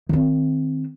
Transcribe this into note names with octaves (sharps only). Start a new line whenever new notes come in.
D#3 C4